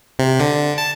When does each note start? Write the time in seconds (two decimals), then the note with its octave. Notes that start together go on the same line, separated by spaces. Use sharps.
0.19 C3
0.40 D3
0.78 A5